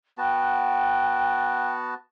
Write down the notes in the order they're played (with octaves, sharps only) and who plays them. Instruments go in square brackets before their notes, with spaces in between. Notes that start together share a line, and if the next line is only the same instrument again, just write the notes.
[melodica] B3 F#4 A5 [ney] G5